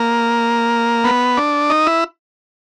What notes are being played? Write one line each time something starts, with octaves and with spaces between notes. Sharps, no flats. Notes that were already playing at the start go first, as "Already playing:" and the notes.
Already playing: A#3
B3
D4
D#4
E4